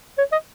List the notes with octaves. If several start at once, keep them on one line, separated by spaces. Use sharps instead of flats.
C#5
D#5